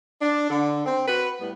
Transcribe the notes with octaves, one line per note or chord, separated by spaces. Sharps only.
D4
D3
C4
F#4 B4
A2 G3 B3